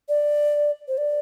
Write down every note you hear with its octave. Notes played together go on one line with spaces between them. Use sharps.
D5
C5
D5